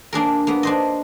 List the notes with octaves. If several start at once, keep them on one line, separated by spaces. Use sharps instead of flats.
A#3 D4 G#4 A#4
A#3 B3
D4 C5 D#5